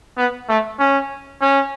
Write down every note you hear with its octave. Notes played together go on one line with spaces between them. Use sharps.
B3
A3
C#4
C#4